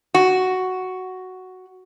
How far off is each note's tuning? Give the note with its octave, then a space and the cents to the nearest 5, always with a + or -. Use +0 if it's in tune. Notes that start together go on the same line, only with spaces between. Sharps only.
F#4 +5